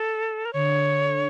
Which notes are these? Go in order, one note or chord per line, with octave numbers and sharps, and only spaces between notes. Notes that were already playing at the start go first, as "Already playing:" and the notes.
Already playing: A4
A#4
D3 C#5